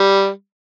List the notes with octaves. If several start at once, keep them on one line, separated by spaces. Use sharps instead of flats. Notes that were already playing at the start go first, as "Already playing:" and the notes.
Already playing: G3